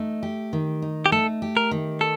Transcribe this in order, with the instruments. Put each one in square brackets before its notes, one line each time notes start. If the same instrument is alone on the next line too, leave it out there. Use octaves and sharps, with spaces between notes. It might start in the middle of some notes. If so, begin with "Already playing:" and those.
Already playing: [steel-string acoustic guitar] A3 D#4
G4
D#3
D#4
[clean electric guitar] G4
[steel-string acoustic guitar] A3 [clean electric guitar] A4
[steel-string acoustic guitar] G4
[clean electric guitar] A#4
[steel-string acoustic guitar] D#3
[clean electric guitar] A4